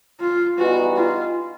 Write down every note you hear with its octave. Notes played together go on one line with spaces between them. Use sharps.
F4
E3 G3 B3 D#4 F#4
F4